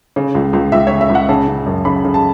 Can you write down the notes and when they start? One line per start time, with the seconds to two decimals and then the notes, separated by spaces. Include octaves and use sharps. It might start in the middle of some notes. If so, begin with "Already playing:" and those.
0.16 C#3
0.35 C#2
0.53 C#2
0.72 C#2 E5
0.87 C#3 C#5
1.01 E5
1.10 C#2
1.15 F#5
1.29 C#3 A5
1.48 C#3
1.66 F#2
1.85 C#3 B5
2.05 C#3
2.14 A5